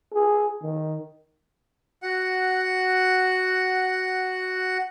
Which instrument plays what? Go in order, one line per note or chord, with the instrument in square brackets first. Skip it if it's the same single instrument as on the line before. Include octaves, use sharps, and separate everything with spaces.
[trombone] G#4
D#3
[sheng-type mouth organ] F#4 F#5